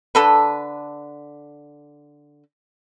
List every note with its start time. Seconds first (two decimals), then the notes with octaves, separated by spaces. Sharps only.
0.15 D3 A4 B4